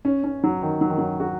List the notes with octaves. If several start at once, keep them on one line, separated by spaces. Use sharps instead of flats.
C#4
C#4
F#3
D#3
F#3
D#3
F#3
F#4